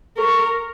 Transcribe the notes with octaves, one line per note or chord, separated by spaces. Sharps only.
A#4 C#6